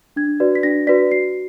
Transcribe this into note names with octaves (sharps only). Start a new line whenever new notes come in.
D4 G#6
F#4 B4 D5
B6
D4 A#6
F#4 B4 D5 B6
F#4 C7